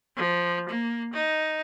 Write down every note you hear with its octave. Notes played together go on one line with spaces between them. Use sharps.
F3
A#3
D#4